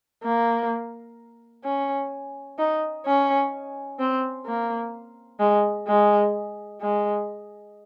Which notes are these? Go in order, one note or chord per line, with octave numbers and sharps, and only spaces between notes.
A#3
C#4
D#4
C#4
C4
A#3
G#3
G#3
G#3